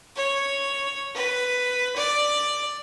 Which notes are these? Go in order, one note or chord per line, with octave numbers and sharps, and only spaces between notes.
C#5
B4
D5